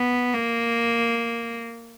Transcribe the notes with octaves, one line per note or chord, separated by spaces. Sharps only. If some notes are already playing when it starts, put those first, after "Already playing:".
Already playing: B3
A#3